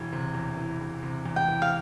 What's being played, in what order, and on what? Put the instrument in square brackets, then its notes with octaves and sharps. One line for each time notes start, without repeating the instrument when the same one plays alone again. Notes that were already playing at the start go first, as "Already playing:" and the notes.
Already playing: [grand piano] E1 E3
C3
E2
E3
E1
C3
E2
[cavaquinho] G5
[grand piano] E3
[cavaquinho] F5